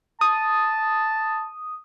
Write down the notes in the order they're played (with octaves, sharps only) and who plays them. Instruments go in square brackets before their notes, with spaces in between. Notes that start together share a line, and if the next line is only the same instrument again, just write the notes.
[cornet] A5 [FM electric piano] D#6